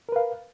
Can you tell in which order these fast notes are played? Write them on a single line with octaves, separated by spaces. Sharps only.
A#4 B4 F5